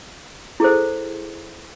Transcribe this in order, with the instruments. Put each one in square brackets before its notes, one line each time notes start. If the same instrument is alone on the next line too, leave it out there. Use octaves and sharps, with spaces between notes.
[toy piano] E4 G#4 A4 C5